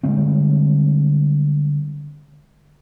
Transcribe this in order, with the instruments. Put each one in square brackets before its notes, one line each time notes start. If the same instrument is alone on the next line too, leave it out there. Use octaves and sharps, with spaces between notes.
[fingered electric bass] D3 G3 G#3 C4